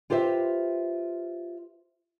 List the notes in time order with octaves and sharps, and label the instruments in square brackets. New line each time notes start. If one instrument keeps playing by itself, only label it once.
[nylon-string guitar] F4 G4 B4 C5 E5